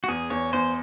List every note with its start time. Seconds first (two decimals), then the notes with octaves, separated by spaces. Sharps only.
0.04 F#4
0.08 E2 G#4
0.30 E2 C#5
0.53 E2 C5